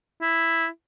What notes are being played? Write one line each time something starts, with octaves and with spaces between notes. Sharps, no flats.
E4